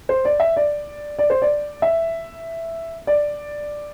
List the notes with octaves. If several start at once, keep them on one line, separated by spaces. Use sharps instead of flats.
C5
D5
E5
D5
D5
C5
D5
E5
D5